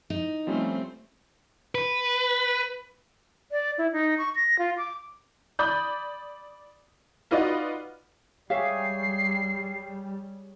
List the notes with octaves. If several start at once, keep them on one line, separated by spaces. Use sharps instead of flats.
D#4
F3 G3 A3 C4 C#4
B4
D5
E4
D#4
C#6
A#6
F4
D6
D5 B5 D6 D#6 G6
D#4 F4 F#4 B4 D5 D#5
G3 G4 G#4 C#5 E5 F5 C7